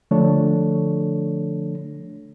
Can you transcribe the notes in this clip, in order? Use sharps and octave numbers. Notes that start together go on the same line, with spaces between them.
D3 F3 A3 D4 A4 C#5